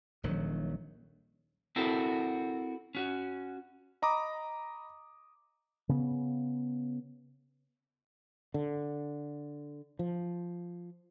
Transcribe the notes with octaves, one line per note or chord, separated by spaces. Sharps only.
D#1 A#1 D#3 F#3
C4 E4 F#4 A4 A#4
C#4 F#4
D#5 A#5 B5 D6 D#6
C#3 B3
D3
F3